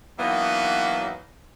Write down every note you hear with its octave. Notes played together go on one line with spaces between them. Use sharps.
E3 F#3 A#3 B3 D4 D#4